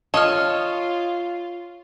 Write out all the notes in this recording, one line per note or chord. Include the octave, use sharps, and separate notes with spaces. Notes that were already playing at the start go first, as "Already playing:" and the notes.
F4 C#5 D#5 A5 F6